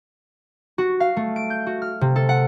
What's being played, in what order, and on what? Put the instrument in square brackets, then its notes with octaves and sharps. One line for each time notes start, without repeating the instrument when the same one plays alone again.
[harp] F#4
F5
A3
D7
G6
F#4
F6
C3
A4
F#5